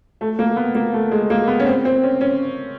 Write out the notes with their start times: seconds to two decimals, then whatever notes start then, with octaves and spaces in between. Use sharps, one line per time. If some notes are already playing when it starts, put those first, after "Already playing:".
0.21 A3
0.39 A#3
0.56 B3
0.75 A#3
0.93 A3
1.11 G#3
1.30 A#3
1.47 B3
1.60 C#4
1.67 C4
1.85 C4
2.03 C#4
2.21 C#4